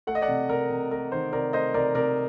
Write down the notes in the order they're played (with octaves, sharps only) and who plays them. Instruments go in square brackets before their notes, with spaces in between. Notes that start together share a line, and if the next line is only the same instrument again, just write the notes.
[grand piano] A3 F#5
D#5
D5 F#5
C3
C3 A#4 D5
C3
A3 A#4
D#3 C5
C3 A#4 D5
A3 C5 D#5
C3 A#4 D5
C3 A#4 D5